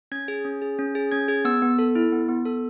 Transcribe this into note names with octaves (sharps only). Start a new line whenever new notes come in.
C#4 G#6
G#4
C#4
G#4
C#4
G#4
C#4 G#6
G#4 G#6
B3 E6
B3
A4
E4
B3
B3
A4